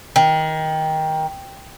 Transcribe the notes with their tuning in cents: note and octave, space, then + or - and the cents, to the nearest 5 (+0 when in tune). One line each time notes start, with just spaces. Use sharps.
D#3 +20